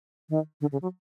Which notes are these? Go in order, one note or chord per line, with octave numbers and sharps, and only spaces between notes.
D#3
D3
C#3
F#3